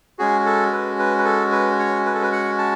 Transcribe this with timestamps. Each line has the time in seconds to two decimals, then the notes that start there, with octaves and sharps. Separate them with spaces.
0.19 G#3 C#4 F#4 G#4
0.46 A4
0.72 B4
0.99 B4
1.18 B4
1.25 A4
1.51 B4
1.79 C#5
2.06 B4
2.14 A4
2.22 B4
2.32 F#5
2.58 A5